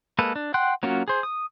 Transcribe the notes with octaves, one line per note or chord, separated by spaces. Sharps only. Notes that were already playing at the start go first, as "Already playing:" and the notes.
G#3 A#3 A4 B4
D4
F#5 G5 C6 F#6
F#3 A#3 C#4 F4 F#4
G#4 C5
D#6